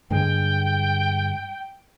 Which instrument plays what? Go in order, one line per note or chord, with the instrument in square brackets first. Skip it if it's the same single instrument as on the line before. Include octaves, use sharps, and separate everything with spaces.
[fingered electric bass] G2 D3 G#3 [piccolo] G5